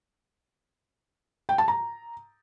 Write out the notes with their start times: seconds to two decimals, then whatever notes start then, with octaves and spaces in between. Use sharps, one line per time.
1.49 G5
1.58 A5
1.68 A#5